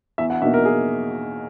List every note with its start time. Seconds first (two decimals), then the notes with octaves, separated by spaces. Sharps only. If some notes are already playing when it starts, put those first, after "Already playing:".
0.18 E2 E5
0.30 F#5
0.42 B2 A#3 D#4 E5
0.54 A#4
0.65 G#4